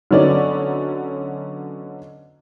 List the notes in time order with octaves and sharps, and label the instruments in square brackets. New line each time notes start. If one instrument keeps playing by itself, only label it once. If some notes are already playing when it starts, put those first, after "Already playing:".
[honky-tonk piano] D3 F#3 B3 C#4 D#4 D5